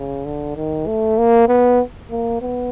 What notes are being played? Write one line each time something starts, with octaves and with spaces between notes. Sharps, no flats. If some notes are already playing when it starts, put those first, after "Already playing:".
Already playing: C#3
D3
D#3
A3
A#3
B3
A#3
B3